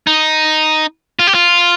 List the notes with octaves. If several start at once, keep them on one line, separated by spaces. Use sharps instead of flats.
D#4
F4
G4
F4